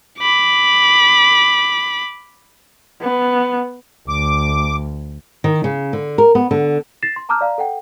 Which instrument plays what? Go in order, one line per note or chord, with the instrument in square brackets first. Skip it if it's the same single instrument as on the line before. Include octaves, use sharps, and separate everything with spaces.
[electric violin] B5 D6
[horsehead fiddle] B3
[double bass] D2 [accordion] D6
[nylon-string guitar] D#3
C#3
D3
A#4
B3
D3
[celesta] A6 A#6 C7 E7
C6
A5 A#5 D6 E6 F6 G6
D5 F5 A#5
A4 F#5 G5